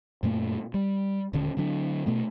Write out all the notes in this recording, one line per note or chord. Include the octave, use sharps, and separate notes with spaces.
F#2 A#2 A3 A#3
G3
D#1 D3 C#4
D3 F#3 D4
B2 A3 B3